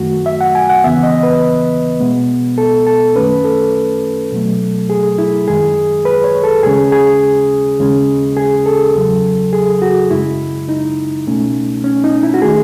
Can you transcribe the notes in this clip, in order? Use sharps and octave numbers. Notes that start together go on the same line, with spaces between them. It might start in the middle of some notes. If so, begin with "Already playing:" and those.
Already playing: F#2 D#3 A3 F#4
E5
F#5
G#5
F#5
D#2 C#3 E3 B3 E5
D#5
B4
B2 G#3 B3
A4
A4
F#2 D#3 A3 C#4 B4
A4
B2 F#3 A3
G#4
E4
F#2 D#3 G#3 G#4
B4
C#5
A4
D#2 C#3 G#3 C#4 G#4
G#4
D#2 C#3 G#3 C#4
G#4
A4
E2 C#3 F#3
G#4
F#4
F#2 C#3 G#3 E4
D#4
C#2 B2 A3 C#4
C#4
D#4
E4
F#4
D#3 A3 G#4